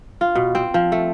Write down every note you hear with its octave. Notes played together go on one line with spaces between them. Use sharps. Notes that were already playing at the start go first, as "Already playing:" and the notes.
F4
B2
C4
F3
A3